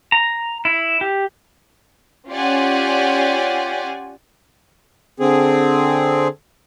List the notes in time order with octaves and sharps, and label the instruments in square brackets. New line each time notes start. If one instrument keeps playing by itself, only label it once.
[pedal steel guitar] A#5
E4
G4
[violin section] C#4 F4 G4 D5 F#5 G#5
[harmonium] D3 C4 G#4